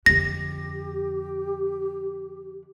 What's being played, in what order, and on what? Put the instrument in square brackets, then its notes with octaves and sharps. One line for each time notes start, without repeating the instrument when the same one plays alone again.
[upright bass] F2 D3 [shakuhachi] G4 [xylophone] A#6